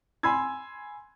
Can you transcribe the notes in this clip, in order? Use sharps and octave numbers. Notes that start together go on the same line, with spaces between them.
G#5 B5 C6 E6 G#6